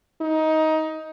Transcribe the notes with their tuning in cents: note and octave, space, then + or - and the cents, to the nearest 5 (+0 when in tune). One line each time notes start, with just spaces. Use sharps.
D#4 +15